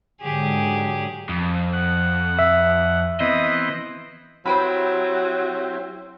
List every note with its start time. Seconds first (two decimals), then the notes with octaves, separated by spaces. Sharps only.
0.21 G#2 D3 F#3 G4 G#4
1.29 F2
1.73 F#5
2.39 E5
3.20 E3 B3 C4 D#5
4.46 F#3 C4 E4 G4 C5 G5 B5